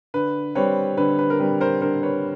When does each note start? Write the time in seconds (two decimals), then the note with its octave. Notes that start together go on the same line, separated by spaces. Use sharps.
0.14 D3 B4
0.55 G3 C4 B4 C#5
0.97 D3 B4
1.19 B4
1.30 A#4
1.40 G3 C4 B4
1.61 A#4 C5
1.81 D3 A#4 C5
2.03 B4 C#5